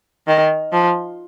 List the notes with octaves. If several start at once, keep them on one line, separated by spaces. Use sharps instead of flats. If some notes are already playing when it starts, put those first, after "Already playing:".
D#3
F3